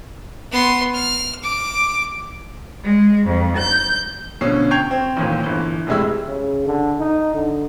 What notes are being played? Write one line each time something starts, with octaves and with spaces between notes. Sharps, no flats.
B3 C6
F6
D6
G#3
F2
G6
B2 D3 F3 C#4 C7
G5 C#6 G6 G#6 C7 F7
C4
A1 D#2 A#2
G1 E3
F1 C3 G3 G#3 E4 E6
C#3
D3
D#4
D3